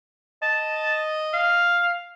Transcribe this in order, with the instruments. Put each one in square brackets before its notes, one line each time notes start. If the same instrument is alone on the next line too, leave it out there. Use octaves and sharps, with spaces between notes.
[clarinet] D#5 [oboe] A5
[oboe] F5